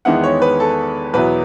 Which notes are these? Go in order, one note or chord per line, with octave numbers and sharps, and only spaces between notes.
E2 D#3 G#3 B3 E4 F#5
C#5
B4
A4
E2 B2 F#3 B3 E4 B4